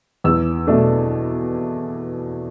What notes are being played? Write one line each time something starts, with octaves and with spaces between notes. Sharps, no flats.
E2 E6
B2 A3 D4